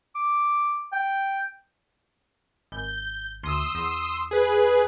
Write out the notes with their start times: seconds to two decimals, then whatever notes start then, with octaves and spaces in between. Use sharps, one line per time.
0.15 D6
0.92 G5
2.72 G#1 G6
3.43 D2 C6 D#6 E6
3.75 E2
4.31 G#4 B4